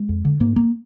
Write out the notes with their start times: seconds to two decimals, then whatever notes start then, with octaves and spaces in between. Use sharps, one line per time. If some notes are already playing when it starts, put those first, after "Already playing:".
Already playing: G#3
0.09 F2
0.25 D3
0.40 G#2 A#3
0.56 A#3